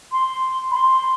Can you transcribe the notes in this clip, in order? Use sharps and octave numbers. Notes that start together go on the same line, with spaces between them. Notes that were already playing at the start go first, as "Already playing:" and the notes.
C6
B5
C6